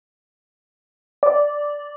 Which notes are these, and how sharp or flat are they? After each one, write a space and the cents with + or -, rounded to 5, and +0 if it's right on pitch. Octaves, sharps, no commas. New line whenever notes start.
D5 -5